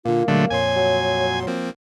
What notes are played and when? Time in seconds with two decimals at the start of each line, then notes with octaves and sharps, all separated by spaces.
0.05 A#2 D3 A#3 F4
0.28 A#2 D3 F#3 G#3 A3
0.50 F2 A#2 C#5 G#5 C6
0.76 F#3
1.47 F3 A#3 C4